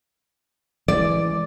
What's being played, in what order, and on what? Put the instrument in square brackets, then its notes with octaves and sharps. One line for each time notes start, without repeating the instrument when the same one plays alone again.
[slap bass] E3 G#3 [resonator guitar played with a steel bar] D5